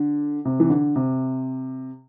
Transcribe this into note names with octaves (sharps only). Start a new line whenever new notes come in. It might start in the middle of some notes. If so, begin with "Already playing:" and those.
Already playing: D3
C3
E3
D3
C3